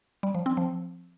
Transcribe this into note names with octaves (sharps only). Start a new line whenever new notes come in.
G3
F3
C4
F3